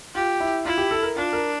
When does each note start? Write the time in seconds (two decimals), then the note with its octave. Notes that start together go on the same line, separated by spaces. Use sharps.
0.15 F4 G4
0.40 E4
0.65 E4 F4
0.78 G4
0.91 A4
1.03 A#4
1.16 D4 F4
1.33 A#4